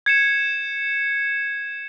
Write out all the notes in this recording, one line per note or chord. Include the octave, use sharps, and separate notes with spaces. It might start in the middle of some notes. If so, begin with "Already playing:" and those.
G#6 C#7 E7